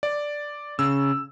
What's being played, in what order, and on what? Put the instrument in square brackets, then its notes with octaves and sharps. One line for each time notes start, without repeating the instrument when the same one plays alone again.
[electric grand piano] D5
[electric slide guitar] C#3 [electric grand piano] E6